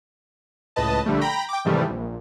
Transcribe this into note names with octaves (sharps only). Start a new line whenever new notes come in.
C#2 A2 B4 D#5 A5
A#1 D3 G3 A3
G5 A#5 B5 A#6
G5 D6
G#2 C3 D#3 E3 G3 A3
A#1